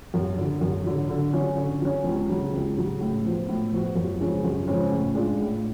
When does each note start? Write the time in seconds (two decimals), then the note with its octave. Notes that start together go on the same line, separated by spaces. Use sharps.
0.14 F#2
0.38 D3 F#3
0.61 F#2
0.86 D3 F#3
1.09 D3
1.33 F#3 C#4
1.57 D3
1.82 F#3 C#4
2.04 C#2
2.29 C#3 F#3
2.53 C#2
2.77 C#3 F#3
3.01 A2
3.25 F3 B3 F#4
3.49 A2
3.72 F3 B3 F#4
3.95 F#2
4.20 C#3 F3 G#3 C#4
4.44 F#2
4.68 C#3 F3 G#3 C#4
4.92 A2
5.15 G#3 D4 F4
5.40 A2